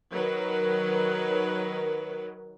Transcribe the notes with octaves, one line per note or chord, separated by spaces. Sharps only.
D#3 F#3 A#4 B4